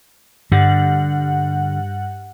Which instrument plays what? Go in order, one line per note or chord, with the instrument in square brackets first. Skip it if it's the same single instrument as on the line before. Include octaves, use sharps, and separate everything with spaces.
[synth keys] G2 F#5 [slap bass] D3